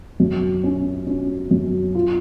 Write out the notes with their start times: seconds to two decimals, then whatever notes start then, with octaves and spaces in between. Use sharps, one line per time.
0.20 F#2
0.64 C#4
1.07 C#4
1.51 F#2
1.95 F4